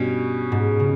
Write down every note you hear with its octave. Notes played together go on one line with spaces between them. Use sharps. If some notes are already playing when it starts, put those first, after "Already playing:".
Already playing: G2 B2 G3 C#4
G#2
C#3